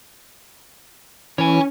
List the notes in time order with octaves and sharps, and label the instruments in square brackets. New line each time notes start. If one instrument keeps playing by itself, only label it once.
[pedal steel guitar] E3 [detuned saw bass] C#4 [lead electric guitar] C#5 G#5